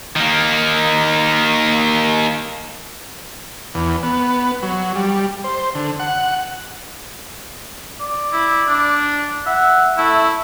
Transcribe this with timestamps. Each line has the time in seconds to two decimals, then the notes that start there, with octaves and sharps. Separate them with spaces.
0.16 D#3 A#3
3.74 E2
4.03 B3
4.62 F#3
4.96 G3
5.44 C5
5.75 D3
6.00 F#5
8.00 D5
8.33 E4
8.68 D4
9.46 E5 F#5
9.98 A3 E4